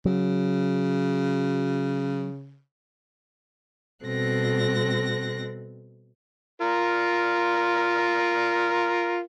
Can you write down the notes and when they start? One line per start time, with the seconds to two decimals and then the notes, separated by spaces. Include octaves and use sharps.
0.05 C#3 F#3
4.04 B2 G3 C4 A4 F#6 A#6
6.61 F4 A#4